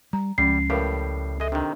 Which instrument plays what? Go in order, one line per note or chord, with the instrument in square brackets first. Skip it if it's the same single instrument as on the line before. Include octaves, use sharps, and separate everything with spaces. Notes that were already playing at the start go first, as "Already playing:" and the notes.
[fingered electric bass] G3 [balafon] A#5
[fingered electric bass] C#2 [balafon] F3 G#3 C#4 [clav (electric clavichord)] G3 [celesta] C7
[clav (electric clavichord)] A2 G3 G4 [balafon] A#4 B4 F5
[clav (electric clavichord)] G#3 D#5 [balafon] A4 E5
[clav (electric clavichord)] C3 D#3 [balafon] D4